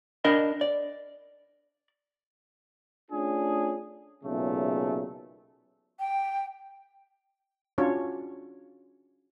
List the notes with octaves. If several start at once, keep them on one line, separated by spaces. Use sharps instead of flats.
D4 A#4 D#5 B5
D5
A3 C#4 D4 F4 G#4
B1 E2 A#2 C#3 A3
G5
C#4 D4 F4 F#4 C#5